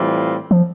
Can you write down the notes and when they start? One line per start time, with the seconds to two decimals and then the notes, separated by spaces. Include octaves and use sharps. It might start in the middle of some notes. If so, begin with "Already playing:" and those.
Already playing: A2 E3 G3 C4 F4
0.51 F3